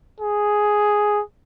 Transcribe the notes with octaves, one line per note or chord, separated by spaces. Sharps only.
G#4